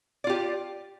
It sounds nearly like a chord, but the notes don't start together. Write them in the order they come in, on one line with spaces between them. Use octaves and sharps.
D5 F4 G4